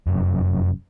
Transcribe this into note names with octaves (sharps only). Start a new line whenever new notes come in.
F1 F#2